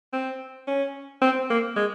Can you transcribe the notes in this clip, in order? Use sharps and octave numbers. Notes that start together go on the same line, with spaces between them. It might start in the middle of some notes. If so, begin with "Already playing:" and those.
C4
C#4
C4
A#3
G#3